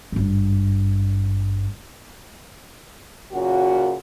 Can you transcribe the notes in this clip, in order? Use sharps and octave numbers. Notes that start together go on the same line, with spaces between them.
G#1 G2
F#2 A#2 C#3 F#4